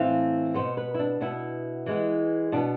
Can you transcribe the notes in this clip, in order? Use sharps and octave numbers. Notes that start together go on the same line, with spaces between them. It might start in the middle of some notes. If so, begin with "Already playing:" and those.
Already playing: A2 E3 A3 C4 F5
B2 B3 C5
B4
E4
D4
B2 B3 E4
E3 G#3 B3
B2 B3 D4